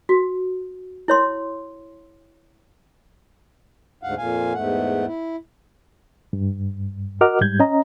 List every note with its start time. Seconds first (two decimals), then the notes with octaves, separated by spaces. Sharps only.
0.09 F#4
1.08 E4 C#5 C6
4.03 D2 G#2 F5 F#5
4.18 F2 A#2 F5 G#5
4.54 E2 G#2 A3 F#5
5.07 E4
6.33 G2
7.21 F#4 A#4 D#5 F#5 D6 F6
7.41 G#2 G3 G6 G#6
7.60 C#4 D#5 A#5